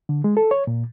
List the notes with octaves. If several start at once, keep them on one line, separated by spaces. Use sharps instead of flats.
D3
G#3
A4
C#5
A#2